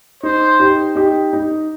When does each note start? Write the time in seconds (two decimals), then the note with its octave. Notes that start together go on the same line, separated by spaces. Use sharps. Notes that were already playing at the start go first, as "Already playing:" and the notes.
0.23 D#4 C5
0.60 D#4 G4
0.96 D#4 G4
1.33 D#4